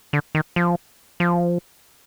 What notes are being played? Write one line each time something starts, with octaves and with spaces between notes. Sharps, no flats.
D3
D#3
F3
F3